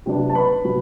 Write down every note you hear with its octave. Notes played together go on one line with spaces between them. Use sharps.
C3 F#3 B3 D4
A5
B4 B5
C3 F#3 B3